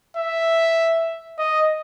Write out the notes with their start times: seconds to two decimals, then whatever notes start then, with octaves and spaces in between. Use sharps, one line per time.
0.17 E5
1.38 D#5